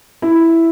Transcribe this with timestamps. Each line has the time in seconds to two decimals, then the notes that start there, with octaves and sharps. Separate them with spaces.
0.22 E4